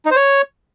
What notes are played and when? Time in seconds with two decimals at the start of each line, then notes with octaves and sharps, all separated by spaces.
0.06 D#4
0.11 C5
0.16 C#5